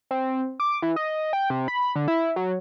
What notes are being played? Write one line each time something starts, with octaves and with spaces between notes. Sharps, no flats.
C4
D6
E3
D#5
G5
C3
B5
D3
E4
F#3